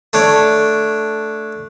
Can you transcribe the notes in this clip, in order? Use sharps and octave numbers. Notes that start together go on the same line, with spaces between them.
A3 D4 C#5